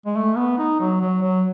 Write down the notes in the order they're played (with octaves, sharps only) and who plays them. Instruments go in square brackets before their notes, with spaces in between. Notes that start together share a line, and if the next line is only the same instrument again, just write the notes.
[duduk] G#3
A3
B3
D#4
F#3
F#3
F#3